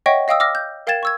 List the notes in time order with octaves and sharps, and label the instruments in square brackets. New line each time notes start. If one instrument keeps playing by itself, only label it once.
[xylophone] C#5 D#5 E5 F#5 G5 C#6
D#5 F5 G5 D#6 E6
D6 E6 F6 A#6
G6
A#4 F5 G5 G#6 A6 E7
C#6 E6 G#6